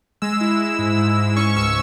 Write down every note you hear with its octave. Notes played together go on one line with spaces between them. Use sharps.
G#3 E6
E4
E4
G#2
G#2
G#2
C#4 C#6
C#2 E6